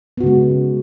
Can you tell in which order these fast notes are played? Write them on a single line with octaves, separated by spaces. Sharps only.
B3 F#4 C#3 G#3